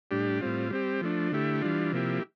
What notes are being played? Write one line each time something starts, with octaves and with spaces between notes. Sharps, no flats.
A2 G3 D4 G4
A2 G3 C4 F4
G3 C4 G4
F3 A3 D4
D3 A3 E4 G4
E3 G3 D4 F4
C3 F3 A#3 E4 G4